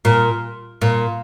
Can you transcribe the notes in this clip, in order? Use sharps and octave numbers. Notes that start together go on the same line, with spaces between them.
A#2
A#2